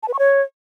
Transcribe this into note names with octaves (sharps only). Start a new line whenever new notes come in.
A5
B4
C#6
C#5